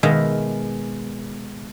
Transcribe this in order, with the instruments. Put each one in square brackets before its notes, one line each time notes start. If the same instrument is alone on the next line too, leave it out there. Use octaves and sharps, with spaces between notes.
[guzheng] B2 D#3 G#3 E5 F5